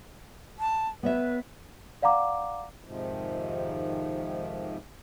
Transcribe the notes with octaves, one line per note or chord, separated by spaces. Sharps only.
A5
B3 B4 C#5 E5
D5 F5 F#5 A#5 D6
F2 G#2 C3 D#3 F3